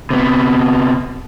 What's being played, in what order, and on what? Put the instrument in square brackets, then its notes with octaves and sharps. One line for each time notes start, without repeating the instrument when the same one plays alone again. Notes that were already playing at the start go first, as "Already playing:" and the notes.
[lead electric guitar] C3 B3